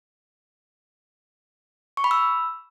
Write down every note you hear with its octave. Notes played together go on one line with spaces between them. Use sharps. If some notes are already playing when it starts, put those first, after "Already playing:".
C#6
B5
E6